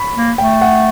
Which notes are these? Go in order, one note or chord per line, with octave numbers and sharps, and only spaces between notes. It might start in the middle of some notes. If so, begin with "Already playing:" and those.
Already playing: B5 C#6
A#3
A3 G5
F#5